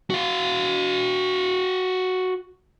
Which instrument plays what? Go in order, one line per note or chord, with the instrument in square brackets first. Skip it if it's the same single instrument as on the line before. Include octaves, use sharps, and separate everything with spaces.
[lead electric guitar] F#4 F5